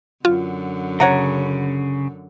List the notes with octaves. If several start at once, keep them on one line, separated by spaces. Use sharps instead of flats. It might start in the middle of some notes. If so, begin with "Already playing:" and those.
F#2 D3 F4
C#3 C#5 F#5 A#5